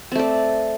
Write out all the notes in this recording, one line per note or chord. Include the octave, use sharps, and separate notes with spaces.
A3 C4 D5